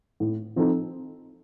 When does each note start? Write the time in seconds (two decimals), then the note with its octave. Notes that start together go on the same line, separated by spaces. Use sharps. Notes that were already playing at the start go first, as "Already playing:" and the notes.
0.20 A2
0.56 F3 C4 D#4 A4